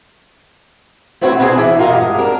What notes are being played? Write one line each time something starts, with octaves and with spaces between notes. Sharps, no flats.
A3 B3 C4 F#4 B4 C#5
C4 D4 E4 F4 G#4 B4
E3 E4
F4 F#4 A#4 B4 D#5 F5
G2 G#3
D4 A#4